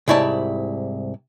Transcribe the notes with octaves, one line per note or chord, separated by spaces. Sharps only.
C2 G#2 E4 C#5 D5 A5